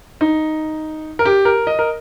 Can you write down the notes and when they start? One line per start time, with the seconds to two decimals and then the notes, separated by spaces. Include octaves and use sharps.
0.21 D#4
1.19 A#4
1.25 G4
1.45 A#4
1.67 D#5
1.79 A#4